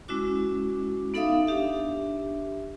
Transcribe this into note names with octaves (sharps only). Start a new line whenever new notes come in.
G#3 C#4 E4 F#4 D6
B3 D#4 A4 E5 F5 D#6
D4 G4 E5